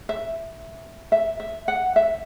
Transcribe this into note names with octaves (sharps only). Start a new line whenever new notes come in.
E5
E5
E5
F#5
E5